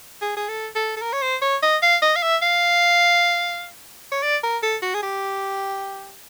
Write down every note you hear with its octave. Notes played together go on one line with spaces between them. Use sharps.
G#4
G#4
A4
A4
A4
A#4
C#5
C5
C#5
D#5
F5
D#5
F5
E5
F5
C#5
D5
A#4
A4
F#4
G#4
G4